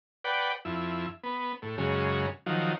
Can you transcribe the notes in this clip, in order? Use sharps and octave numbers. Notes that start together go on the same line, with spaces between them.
B4 D5 F#5 G5
F2 E4
B3
A2
F#2 C#3 G#3
D#3 F3 F#3